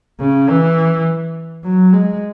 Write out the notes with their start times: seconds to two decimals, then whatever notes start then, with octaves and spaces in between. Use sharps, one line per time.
0.20 C#3
0.49 E3
1.64 F#3
1.93 G#3